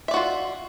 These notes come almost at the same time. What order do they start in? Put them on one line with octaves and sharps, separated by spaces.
E5 D5 F#4 F4